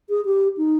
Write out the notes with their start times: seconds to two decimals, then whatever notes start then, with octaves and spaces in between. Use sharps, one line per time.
0.09 G#4
0.25 G4
0.57 D#4